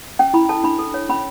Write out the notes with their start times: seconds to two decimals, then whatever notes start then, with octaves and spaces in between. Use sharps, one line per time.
0.19 C#4 G5
0.34 E4 B5
0.49 A4 A5
0.64 D4 B5
0.79 A4
0.94 C#5
1.09 C#4 B5